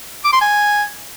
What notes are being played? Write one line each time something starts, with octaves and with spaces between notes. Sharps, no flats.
D6
C6
G#5